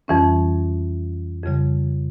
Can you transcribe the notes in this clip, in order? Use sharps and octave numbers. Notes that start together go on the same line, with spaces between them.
F2 E3 G3 C#4
F2 C#3 G3